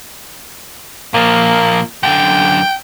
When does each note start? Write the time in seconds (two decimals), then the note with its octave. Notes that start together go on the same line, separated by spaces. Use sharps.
1.14 A#2 F3 A#3
2.04 F#2 D3 G5